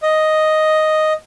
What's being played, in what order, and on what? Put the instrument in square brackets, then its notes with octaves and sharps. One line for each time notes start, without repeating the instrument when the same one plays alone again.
[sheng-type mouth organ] D#5